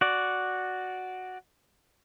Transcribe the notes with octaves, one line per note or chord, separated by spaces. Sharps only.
F#4 D5